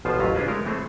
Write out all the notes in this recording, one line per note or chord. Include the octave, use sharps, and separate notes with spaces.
A1 B2 F3 F4 C5 A5
A1 D#2 F#3 F4 B4 A#5
C#4 D4 F4 G#4 B4 C5
G#3 A3 A#4 C#5
E3 A3 C4 G#4 A4